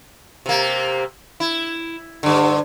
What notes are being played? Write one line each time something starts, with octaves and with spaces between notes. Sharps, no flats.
C3 A#3
E4
G2 D3